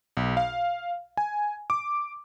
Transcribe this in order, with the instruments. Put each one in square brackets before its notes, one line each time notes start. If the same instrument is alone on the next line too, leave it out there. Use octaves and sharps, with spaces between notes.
[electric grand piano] B1
F5
G#5
D6